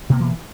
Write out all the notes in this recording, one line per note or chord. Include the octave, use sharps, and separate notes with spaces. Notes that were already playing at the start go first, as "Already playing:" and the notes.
B2 E3 A#3 B3